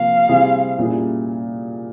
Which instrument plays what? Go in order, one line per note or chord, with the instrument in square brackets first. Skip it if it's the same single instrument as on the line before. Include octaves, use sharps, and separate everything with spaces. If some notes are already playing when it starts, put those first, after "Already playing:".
Already playing: [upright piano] C3 F3 A#3 [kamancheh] F5
[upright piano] C3 G3 C4 E4 G#4
A#2 G3 C#4 E4 G#4